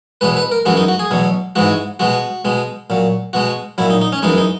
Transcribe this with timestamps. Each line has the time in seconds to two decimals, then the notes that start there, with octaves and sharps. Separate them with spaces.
0.21 E2 B2 G#3 B4
0.37 B4
0.51 A#4
0.65 F#2 E3 G#3 F#4
0.77 D#4
0.88 F#4
0.99 G#4
1.11 E2 B2 F#3
1.56 G#2 E3 G#3 F#4
2.00 B2 G#3 F#4
2.45 B2 G#3
2.90 A#2 F#3
3.33 B2 G#3 F#4
3.78 A#2 F#3 E4
3.90 D#4
4.01 D#4
4.12 C#4
4.23 F#2 E3 G#3 D#4
4.38 D#4